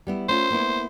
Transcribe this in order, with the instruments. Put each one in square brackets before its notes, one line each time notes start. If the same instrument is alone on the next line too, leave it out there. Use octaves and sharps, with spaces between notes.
[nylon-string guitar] G3 B3 E4
[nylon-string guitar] A3 C#4 F4 [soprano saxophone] C5
[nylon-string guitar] A#3 B3 E4